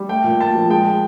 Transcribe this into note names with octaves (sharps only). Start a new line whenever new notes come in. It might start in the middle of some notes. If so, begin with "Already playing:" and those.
Already playing: G3
A3 G5
A#2
A#2 A5
F3
G#3 G5